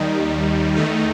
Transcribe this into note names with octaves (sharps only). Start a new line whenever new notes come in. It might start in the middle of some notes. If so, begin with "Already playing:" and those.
Already playing: D#2 D#3 G3 D#4
E2 D#3 A3 D#4